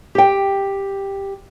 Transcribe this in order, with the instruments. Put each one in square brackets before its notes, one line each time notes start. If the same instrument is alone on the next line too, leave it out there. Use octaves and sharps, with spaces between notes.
[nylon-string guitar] G4 G5